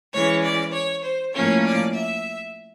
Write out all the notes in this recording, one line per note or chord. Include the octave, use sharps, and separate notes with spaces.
E3 G#3 C#4 C#5
D5
C#5
C5
A2 F3 A#3 C#4 C#5
D5
E5